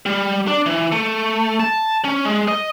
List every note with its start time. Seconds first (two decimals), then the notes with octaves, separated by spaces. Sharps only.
0.06 G3
0.48 D4
0.66 E3
0.92 A3
1.60 A5
2.05 C#4
2.25 G#3
2.48 D#5